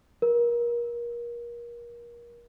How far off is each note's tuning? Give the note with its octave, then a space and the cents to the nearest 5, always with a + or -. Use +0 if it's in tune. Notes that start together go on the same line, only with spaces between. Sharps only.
A#4 +30